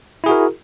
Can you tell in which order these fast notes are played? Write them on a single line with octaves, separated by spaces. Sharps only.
E4 G#4 F#4 A#4